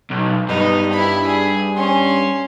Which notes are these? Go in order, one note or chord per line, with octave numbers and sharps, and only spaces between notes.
B1
G2 B3 D#4
E4 B5
G#4
C#4 C6